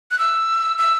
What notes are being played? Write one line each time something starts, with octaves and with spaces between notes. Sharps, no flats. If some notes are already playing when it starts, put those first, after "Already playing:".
F#6
E6
E6